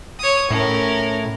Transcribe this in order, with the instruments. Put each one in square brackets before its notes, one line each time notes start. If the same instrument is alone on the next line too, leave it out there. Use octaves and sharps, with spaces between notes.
[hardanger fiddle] C#5 D#6
[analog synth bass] A2 [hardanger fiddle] C#4 A#4